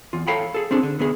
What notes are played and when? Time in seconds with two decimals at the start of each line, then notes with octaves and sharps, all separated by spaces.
0.13 E2 F4
0.27 A4 C#5 F5 G5 A#5 B5
0.54 G#4 A4
0.71 C4 D4 G#4 A4
0.83 D3
0.99 D3 B3 G#4